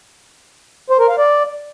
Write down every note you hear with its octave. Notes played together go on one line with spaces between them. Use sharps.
C5
A#4
F5
D5